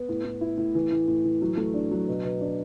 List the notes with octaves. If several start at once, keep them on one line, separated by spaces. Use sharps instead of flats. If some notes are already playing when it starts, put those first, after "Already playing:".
Already playing: B3
A2
A2
E4
A2
E3
A2
A2
E3
F#3
A3
D4
F#3
B2
B2
D4